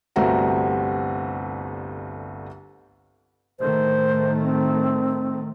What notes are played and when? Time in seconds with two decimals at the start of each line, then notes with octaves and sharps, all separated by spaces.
0.16 G1 C2 A3 C4 F#4 A#5
3.60 A2 D#3 A3 C5
4.43 C4